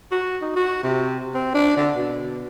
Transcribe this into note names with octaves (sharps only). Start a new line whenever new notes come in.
F#4
D#4
F#4
C3
C4
D4
D3
B2